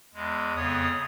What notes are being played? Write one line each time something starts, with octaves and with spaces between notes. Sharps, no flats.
E2 G#3
F2 C#3 B3 C#5 D#6